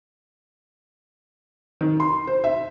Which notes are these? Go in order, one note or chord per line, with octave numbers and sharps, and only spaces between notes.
D#3
C6
C5
E5